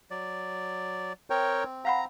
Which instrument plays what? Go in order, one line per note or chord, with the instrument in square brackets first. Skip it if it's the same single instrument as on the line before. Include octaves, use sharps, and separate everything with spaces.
[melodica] F#3 D5
[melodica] C4 [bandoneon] A#4 C#5 G5
[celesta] F5 F#5 B5 [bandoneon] A#5